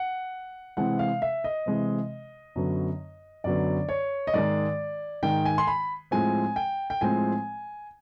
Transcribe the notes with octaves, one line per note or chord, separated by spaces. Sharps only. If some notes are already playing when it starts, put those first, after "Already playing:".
Already playing: F#5
C3 E3 G#3 C4 F#5
F5
E5
D#5
C3 E3 G#3 C4
F#2 D3 F#3 B3
F#2 D3 F#3 B3 D5
C#5
D#5
G#2 D#3 G#3 D5
G#2 D#3 G#3 G5
G#5
C6
B5
A2 F3 G#3 C4 G#5
G5
G5
A2 F3 G#3 C4 G#5